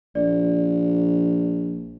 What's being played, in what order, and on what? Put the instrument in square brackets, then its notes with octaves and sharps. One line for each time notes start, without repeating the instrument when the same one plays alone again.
[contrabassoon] A#1 [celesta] D5